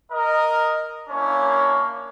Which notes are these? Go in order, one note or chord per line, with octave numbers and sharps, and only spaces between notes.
A#4 D#5
A#3 C#4 D4 E4 C#5